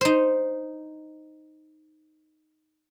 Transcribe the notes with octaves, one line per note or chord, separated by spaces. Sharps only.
D#4 C5